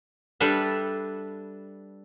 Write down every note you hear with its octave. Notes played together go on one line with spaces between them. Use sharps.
G3 D4 A4 B4 E5